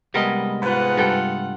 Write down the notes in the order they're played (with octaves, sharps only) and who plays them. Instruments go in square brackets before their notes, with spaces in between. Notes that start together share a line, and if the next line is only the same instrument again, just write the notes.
[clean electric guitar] C2 G#3 D#5 [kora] G3 B3 A#4
[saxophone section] G#2 B4 [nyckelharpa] F4 F#5
[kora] G2 A4 G5